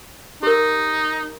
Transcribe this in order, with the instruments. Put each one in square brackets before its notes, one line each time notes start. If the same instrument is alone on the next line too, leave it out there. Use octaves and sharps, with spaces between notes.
[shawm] D#4 [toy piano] G4 A#4